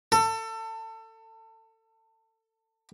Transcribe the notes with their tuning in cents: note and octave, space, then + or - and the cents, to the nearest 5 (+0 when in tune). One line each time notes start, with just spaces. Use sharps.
A4 +25